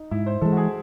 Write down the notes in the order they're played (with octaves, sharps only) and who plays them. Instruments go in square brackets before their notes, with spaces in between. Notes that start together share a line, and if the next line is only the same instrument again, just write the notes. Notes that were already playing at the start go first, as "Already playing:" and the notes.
Already playing: [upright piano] D#4
[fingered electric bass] G#2 [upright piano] E4
[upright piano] C5
[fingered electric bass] E3 G#3 [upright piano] A4
[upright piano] F#4
G#4